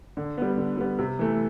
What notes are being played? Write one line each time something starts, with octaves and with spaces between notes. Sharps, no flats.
D3
G3 B3
D3
G3 B3
C3
E3 A3